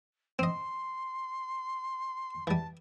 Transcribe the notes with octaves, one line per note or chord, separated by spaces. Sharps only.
C4 D#5 C6
E3 G3 A5